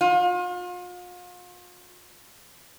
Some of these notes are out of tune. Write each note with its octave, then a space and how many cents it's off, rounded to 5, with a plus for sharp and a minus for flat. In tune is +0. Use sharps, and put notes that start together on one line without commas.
F4 +40